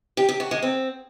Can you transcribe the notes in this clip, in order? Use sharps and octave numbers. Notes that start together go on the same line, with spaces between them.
G4
G4
F#4
G#3
C4